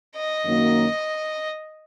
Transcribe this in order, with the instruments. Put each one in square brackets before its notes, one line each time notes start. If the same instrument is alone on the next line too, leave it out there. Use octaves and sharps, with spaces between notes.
[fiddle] D#5
[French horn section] F#2 D#3 F#3 A#3